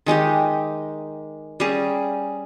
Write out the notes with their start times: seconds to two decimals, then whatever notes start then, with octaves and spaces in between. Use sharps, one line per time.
0.06 D#3 G#3 D#4 G4
1.60 G3 C#4 G#4